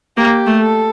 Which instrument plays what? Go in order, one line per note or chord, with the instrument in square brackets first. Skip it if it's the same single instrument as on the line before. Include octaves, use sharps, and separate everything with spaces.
[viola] A#3 [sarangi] G4
[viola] A3
[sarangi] A4